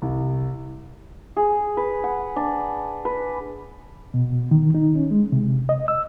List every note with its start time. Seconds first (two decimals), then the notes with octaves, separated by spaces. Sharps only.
0.02 C2
1.36 G#4
1.77 B4
2.04 F#5
2.36 D4
3.05 B4
4.14 B2
4.51 D#3
4.75 D#4
4.95 C#4
5.11 G#3
5.32 C3
5.69 D#5
5.88 E6